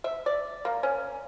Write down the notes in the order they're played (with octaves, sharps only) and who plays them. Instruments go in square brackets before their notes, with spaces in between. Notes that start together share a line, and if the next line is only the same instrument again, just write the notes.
[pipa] E5
D5
A#3
C#4